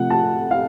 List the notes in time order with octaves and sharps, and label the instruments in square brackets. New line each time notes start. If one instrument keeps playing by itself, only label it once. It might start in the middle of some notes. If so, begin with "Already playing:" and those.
Already playing: [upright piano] C3 F3 A3 F#5
A5
F5